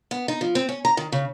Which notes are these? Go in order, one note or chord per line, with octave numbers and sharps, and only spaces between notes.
B3
D#4
F3
C4
C#4
A#5
D#3
C#3